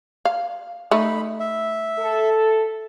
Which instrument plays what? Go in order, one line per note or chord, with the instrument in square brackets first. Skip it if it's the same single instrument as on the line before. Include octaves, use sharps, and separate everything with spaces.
[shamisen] F5
[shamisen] A3 D#4 [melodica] B5
[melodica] E5
[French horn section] A4